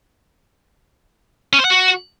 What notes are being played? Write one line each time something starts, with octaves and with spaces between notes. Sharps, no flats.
C#4
C5
F#5
F#4